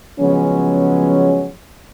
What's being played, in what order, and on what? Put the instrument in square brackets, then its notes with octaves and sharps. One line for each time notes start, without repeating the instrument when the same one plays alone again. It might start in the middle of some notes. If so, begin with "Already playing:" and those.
[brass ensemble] C#3 F3 F#3 G#3 B3 C#4